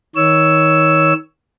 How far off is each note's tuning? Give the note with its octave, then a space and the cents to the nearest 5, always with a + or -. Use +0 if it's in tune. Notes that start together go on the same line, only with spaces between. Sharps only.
D#3 +25 C#5 +10 E6 +0